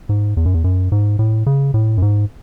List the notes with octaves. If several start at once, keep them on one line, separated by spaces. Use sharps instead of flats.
G#2
E2
F#2
E2
F#2
G#2
A2
C#3
A2
F#2
G#2